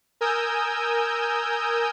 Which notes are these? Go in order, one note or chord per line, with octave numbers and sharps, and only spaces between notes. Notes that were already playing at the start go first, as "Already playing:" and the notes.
A#4 G#5 D#6 E6 G6